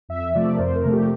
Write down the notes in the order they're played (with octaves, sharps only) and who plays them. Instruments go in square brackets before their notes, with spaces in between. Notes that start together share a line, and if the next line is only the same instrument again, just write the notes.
[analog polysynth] F2 E5
C3 F3 A3 D5
A#4
F2 C5
A#4
C3 F3 A3
G4